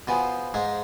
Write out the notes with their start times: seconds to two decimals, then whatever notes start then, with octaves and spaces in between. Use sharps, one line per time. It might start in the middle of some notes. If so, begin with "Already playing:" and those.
0.08 B2 B3 F4 G#4 C5
0.54 G#2 G#3